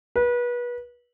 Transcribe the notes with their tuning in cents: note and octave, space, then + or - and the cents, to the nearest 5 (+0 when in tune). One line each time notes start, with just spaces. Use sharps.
B4 -30